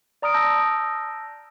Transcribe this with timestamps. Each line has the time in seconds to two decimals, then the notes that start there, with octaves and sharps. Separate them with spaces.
0.22 D5 A#5 D#6 F6 D7
0.34 A5 E6 G6 A#6